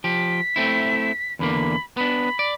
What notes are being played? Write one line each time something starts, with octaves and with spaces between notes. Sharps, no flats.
F3 G4 B6
A3 C4 E4
E2 D3 A#3 B5
B3 D4 B5
D5